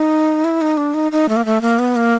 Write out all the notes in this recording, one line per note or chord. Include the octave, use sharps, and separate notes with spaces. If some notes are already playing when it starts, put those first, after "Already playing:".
Already playing: D#4
E4
D#4
D4
D#4
D#4
A3
A#3
A3
A#3
B3
A#3